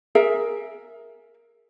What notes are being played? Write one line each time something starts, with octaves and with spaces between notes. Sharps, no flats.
G#4 A#4 E5